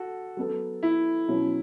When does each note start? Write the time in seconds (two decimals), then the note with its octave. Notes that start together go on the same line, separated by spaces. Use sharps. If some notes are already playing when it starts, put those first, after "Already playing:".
Already playing: F#4 A4
0.37 F#3 B3 A4
0.83 E4
1.28 B2 F#3 C#4 E4